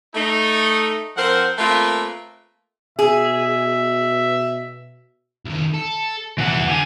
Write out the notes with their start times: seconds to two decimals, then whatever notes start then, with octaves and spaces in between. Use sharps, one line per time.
0.15 A3 D#4
1.17 F3 C4 A#4 C5 F#5
1.58 A3 A#3 C4 F4 A#4 B4
2.99 B2 G#4 E5
5.46 C2 D#3
5.74 A4
6.38 C2 E3 B3 F#5
6.68 D3 G4 G#5